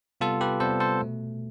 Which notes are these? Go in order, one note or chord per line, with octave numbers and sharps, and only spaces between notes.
C3 G3 B3 F4 A4
G4 B4
C3 G3 B3 A4 C5
A4 C5
B2 A3